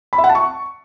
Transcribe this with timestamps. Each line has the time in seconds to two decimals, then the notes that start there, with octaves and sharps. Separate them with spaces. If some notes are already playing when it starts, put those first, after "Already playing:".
0.13 B5
0.18 E5
0.24 F#5
0.29 A5
0.35 C#6